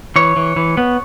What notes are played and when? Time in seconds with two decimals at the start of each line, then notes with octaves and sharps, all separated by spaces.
0.16 E3 C#5
0.36 E3
0.56 E3
0.77 B3